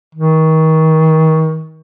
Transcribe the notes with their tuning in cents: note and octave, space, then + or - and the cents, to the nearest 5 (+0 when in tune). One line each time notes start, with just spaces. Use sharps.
D#3 +35